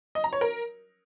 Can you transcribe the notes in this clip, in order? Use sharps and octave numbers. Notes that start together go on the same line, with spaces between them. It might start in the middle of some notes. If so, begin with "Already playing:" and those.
D#5
A#5
C#5
A#4